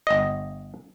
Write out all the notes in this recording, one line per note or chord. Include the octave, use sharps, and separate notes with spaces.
G1 D#5